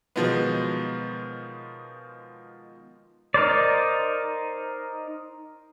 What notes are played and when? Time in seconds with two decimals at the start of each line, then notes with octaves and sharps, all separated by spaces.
0.16 B2 D#3 F3 F#3 G#3 B3
3.34 D#4 A#4 C5 D5